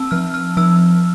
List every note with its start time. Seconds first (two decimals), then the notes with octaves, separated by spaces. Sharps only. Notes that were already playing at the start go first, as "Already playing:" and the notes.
Already playing: C4 A5 E6
0.11 F3 F6
0.34 F6
0.57 F3 E6